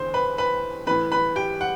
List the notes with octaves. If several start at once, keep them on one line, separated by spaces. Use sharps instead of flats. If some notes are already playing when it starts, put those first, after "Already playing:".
Already playing: E2 D3 C5 C6
B4 B5
B4 B5
A2 E3 B4 B5
B4 B5
G4 G5
F#5